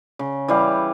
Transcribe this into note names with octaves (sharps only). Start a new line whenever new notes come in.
C#3
E3 G3 F5